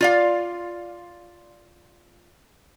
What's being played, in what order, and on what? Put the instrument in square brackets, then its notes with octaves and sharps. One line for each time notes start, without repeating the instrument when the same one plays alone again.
[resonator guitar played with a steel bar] F4 D5 F5